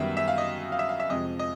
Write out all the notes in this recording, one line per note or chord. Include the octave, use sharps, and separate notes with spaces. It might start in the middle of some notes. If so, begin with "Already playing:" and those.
Already playing: F#2 D#3 G3 B3 E5
E5
F5
D#5
F5
E5
F5
E5
F2 C3 F3 G#3 D#5
D#5